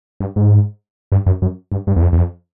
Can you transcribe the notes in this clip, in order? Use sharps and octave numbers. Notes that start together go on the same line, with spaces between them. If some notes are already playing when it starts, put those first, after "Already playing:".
G2
G#2
G2
F#2
F#2
G2
G2
E2
F2
E2
F2